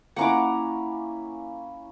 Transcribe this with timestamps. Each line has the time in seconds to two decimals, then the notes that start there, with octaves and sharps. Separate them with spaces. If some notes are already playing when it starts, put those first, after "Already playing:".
0.17 A#3 C#4 E4 F#5 A#5 D6